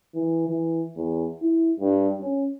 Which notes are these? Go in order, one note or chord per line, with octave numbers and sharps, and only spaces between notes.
E3
E3
E2
E4
G2
C#4